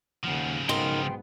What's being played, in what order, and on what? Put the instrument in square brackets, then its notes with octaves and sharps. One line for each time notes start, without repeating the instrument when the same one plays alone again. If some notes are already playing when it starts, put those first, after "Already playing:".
[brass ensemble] D#2 F#5 [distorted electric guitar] C#3 F3
[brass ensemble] B1 G#2 B3 [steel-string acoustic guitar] D#4 A#4 [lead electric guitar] G5 C6